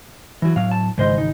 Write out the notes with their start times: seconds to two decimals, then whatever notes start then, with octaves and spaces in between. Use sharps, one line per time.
0.42 E3 F#3
0.56 A2 F#3 F5
0.71 A5
0.98 G#1 G#2 C#3 E3 C5 D#5
1.18 D#4